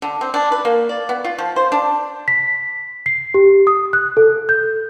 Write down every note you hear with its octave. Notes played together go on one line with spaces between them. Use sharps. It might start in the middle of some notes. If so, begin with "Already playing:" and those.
D3
C4
D4
B4
A#3
D5
B3
F4
F3
C5
D4
B6
C7
G4
D#6
F#6
A4
G6